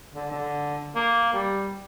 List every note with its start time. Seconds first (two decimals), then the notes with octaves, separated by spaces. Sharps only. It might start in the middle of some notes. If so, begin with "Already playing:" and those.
0.14 D3
0.32 D3
0.95 A#3
1.33 G3